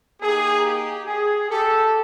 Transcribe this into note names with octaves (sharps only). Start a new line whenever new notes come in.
A#3 D#4 G4 G#4
G4
G#4
G4 A4